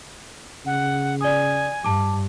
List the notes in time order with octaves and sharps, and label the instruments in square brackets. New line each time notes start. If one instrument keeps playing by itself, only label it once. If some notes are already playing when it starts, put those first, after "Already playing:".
[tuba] C#3 [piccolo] F#5
[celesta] D5 D#6 [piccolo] G#5
[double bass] G2 [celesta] A5 D6